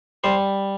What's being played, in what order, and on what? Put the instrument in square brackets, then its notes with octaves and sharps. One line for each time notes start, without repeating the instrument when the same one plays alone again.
[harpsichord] G3 C5